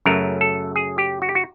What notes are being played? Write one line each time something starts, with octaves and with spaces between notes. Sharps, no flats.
F#2 C#3 F#3 A3 A#4
A4
G#4
G4
F#4
G4
F#4